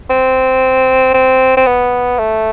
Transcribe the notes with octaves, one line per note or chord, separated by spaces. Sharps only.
C4
C4
C4
B3
A3